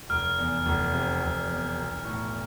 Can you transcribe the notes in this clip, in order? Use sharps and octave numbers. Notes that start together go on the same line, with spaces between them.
F1 F6
E2
F1
C3
F1
E2
B1
A2